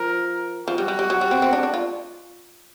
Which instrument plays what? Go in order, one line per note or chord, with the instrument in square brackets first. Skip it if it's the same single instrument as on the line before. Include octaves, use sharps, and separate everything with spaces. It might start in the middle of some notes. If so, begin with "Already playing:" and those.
Already playing: [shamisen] F3 [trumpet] A#4
[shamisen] F3 [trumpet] F#4
[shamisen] G3
G3
G3
F#3
G3
C4
C4
D4
D4
F4